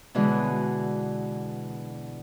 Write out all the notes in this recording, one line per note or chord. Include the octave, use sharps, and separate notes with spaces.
B2 D3 E3 G#3